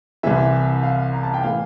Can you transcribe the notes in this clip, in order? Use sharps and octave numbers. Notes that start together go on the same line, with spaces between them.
C2 C3 E3 E5
F5
A#5
A5
G5
A2 E3 F5